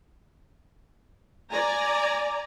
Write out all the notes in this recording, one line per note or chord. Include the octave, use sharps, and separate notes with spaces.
D5 G#5 A#5